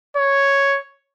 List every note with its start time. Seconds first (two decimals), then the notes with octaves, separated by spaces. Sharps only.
0.17 C#5